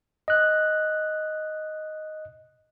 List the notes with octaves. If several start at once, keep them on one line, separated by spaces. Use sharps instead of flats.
D#5 F#6